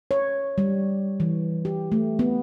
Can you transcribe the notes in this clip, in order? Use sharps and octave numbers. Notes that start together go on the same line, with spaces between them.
C#5
G3
E3
G4
A3
B3